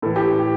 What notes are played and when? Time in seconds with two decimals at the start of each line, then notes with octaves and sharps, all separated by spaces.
0.02 A2 E3 A4
0.16 G4